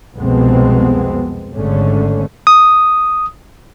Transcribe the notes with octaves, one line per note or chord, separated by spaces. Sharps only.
C2 F2 B2 G#3 B3 C4
G#1 G#2 D3 A3 C#4
D#6